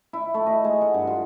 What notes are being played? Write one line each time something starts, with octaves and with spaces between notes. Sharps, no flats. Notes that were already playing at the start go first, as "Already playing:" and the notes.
E4
A3
D#5
G#3
F#5
G2
F4